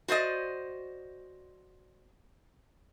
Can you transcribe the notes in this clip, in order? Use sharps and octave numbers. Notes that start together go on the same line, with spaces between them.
F#4 C5 D5 D#5